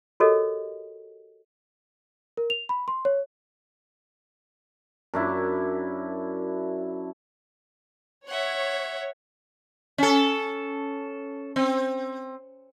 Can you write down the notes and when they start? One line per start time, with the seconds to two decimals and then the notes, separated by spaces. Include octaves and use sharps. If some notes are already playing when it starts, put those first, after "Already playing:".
0.20 F#4 G4 A4 A#4 C#5 D#5
2.37 A#4
2.50 F7
2.69 B5
2.88 C6
3.05 C#5
5.14 F#2 D4 E4
8.28 C#5 E5 F#5
9.98 C#4 A4
11.56 C4